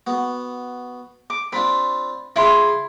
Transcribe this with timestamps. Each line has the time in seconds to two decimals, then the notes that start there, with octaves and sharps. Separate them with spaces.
0.07 B3 F#4
1.30 D6
1.52 C4 D4 F4 B5
2.36 C#3 E4 F4 B5 C6